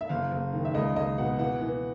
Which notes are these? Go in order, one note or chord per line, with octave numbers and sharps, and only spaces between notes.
E5
F#1 F5
F#1
D#3
E5
C#2 D#5
C#2 D#5
B2 F#5
E3 F#5
E3